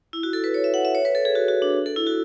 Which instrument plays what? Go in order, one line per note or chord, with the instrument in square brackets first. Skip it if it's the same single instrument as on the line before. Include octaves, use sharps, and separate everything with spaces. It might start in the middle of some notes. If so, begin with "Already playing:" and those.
[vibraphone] E4
F#4
A4
B4
C#5
E5
F#5
E5
C#5
B4
A4
G#4
F#4
F#4
D4
A4
E4
F#4